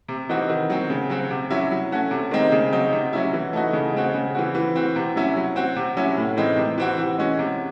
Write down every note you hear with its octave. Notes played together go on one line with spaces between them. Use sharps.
C3
E3 C4 D#4 F#4
D#3
F#3 C4
C#3
F#3 C4 F#4
C3
F#3 C#4 E4
F#3
A3 C#4 F#4
C3
D#3 G#3 C4 D#4
C#3
F#3 C4 D#4
C3
F#3 C#4 E4
E3
A3 D#4 F#4
C#3
G#3 C4 F#4
C#3
E3 C4 F#4
E3
C4 F#4
C3
F#3 C#4 E4
F#3
C4 F#4
C3
F#3 C#4 E4
A2
E3 G#3 C4 D#4
C3
E3 C4 F#4
E3
G#3 C#4 F#4
C3